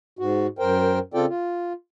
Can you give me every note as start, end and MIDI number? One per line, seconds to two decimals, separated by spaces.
0.19 0.47 44
0.19 0.47 66
0.59 0.99 42
0.59 0.99 70
0.59 0.99 72
0.59 0.99 79
1.14 1.25 49
1.14 1.25 60
1.14 1.25 65
1.14 1.25 69
1.14 1.25 74
1.14 1.25 79
1.29 1.73 65